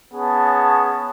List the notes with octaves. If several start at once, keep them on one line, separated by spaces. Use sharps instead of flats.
B3 C#4 G#4 A5